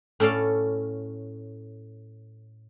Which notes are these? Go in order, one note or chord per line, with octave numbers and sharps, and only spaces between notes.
A2 C#4 A4 D5 F5